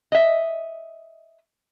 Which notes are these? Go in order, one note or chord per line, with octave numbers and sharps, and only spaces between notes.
D#5 E5